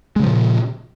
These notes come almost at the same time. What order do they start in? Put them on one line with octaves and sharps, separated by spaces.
G#3 C#3 F3 A#2